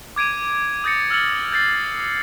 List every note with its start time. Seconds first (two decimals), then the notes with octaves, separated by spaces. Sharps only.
0.16 D6 G#6 D7 D#7
0.84 D#6 G6 A6 A#6 C#7
1.10 E6 F6 A6 C#7 F#7
1.52 G6 A6 C7